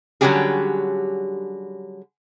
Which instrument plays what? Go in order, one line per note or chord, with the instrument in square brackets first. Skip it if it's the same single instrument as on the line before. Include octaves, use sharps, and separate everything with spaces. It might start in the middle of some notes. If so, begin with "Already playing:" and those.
[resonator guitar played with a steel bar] D3 F#3 G3 C#4 G4 G#4